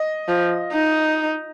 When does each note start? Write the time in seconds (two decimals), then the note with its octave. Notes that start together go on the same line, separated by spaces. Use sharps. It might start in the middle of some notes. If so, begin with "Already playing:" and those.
Already playing: D#5
0.28 F3
0.73 D#4